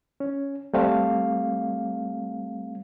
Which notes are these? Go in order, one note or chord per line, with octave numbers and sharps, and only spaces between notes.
C#4
G3 A3 C4 F5